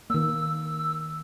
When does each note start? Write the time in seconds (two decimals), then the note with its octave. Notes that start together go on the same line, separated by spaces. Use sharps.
0.10 D#3 A#3 E6